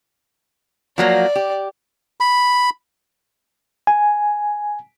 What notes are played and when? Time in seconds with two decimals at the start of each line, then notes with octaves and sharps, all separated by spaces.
0.98 F3 F#3 A#3 D5
1.36 G4
2.20 B5
3.87 G#5